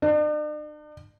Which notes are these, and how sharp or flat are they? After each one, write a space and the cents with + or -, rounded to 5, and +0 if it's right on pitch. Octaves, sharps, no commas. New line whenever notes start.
D4 +45